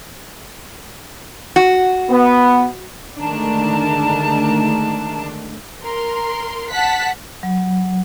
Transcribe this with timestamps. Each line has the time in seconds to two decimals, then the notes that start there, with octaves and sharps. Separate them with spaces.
1.56 F#4
2.10 B3
3.18 D3 D#3 G#3 A3 D4 A5 A#5
5.81 A#4 C6
6.70 F#5 A5 F#6 B6
7.43 F#3